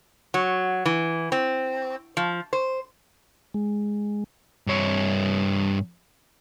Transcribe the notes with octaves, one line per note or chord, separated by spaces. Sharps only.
F#3
E3
C4
F3
C5
G#3
G2 C#5